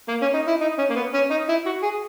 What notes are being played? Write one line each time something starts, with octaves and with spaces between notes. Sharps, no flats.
A#3
C#4
D#4
E4
D#4
C#4
A#3
B3
C#4
D#4
E4
F#4
G#4